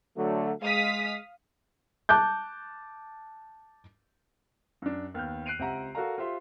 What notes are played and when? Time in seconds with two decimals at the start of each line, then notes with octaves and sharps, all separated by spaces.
0.17 D3 F#3 A3
0.61 G#3 F5 D#6 B6
2.09 A5 D6 F#6 G6
4.82 F#2 D4
5.14 D#2 B3 F6 G6
5.46 F#6 C7 D7 D#7 F7
5.59 C#2 C4 G4 E5 F#5 A#5
5.95 F#4 A4 A#4 D5 F5 A#5
6.18 F4 G4 C5 E5 C6